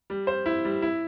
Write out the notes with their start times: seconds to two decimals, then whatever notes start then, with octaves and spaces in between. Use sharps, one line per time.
0.10 G3
0.27 C5
0.46 E4
0.65 G3
0.82 E4